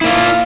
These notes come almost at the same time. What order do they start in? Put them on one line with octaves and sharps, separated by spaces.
E4 A#3 F4